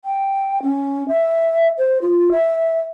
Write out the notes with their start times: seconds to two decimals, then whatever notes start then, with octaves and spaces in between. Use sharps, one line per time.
0.05 G5
0.63 C#4
1.08 E5
1.78 C5
2.02 F4
2.32 E5